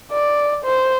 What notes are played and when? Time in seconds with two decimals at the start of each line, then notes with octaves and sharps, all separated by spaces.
0.12 D5
0.65 C5